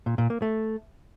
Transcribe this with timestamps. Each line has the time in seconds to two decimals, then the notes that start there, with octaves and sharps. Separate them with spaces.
0.06 A#2
0.18 A#2
0.30 A#3
0.42 A3